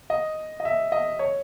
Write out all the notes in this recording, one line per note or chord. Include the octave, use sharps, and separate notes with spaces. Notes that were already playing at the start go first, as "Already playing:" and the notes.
D#5
D#5
E5
D#5
C#5